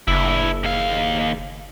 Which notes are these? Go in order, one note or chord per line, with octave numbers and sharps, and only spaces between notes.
F#1 D4 E4
D#2 F5